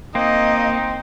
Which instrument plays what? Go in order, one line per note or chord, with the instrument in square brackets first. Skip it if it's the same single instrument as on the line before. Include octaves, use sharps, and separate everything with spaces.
[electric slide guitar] A#3 [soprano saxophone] C4 [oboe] D#4 [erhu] D#5